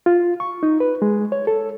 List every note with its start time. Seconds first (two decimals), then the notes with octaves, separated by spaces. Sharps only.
0.06 F4
0.40 C#6
0.63 D#4
0.80 B4
1.02 G#3
1.32 C#5
1.47 A4